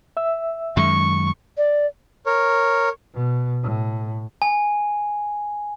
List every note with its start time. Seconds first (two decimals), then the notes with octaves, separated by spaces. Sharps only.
0.17 E5 E6
0.77 F#2 D#3 G#3 C#6
1.57 D5
2.26 A#4 C#5
3.14 B2
3.62 A2
4.42 G#5